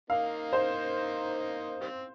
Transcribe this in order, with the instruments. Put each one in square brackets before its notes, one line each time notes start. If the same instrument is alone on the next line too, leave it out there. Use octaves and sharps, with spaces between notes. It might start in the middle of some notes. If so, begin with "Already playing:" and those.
[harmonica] A#3 D#4 [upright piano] F5
[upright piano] C5
[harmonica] D#3 G3 C4